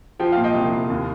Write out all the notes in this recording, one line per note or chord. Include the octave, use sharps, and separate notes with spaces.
F3 G5
A#2 F5
D#5 G5
C2
C2
D#2